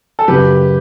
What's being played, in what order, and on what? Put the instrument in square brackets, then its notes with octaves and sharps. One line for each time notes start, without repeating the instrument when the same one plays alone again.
[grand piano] A4
[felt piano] F#2 C#3 F#3 [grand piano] G4 B4